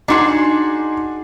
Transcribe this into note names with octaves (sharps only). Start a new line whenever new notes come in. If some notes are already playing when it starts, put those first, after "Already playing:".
D4 D#4 F#4 G#4 C6